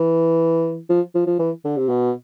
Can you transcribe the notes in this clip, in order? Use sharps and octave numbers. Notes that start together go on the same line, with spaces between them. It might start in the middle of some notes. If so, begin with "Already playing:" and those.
Already playing: E3
F3
F3
F3
E3
D3
C3
B2